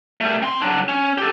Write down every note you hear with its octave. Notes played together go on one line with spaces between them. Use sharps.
G3 A3
C4 C6
F#3 D4
C#4
G4 A4